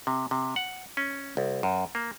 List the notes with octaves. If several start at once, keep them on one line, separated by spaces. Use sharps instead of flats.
C3
C3
F#5
C#4
C2
F#2
A#3